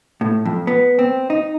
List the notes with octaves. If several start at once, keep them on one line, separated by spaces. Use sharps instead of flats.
A2
F2
B3
C4
D#4